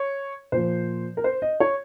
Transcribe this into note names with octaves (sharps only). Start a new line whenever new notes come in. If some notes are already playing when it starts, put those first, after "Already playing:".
Already playing: C#5
A#2 F3 C5
A#4
C5
D#5
C#5